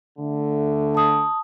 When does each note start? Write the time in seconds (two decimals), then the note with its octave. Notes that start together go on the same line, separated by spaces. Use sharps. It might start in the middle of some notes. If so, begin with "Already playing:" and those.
0.19 D3 A3
0.95 A5 D#6